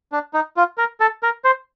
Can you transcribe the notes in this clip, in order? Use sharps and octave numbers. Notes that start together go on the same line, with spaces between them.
D4
D#4
F4
A#4
A4
A#4
C5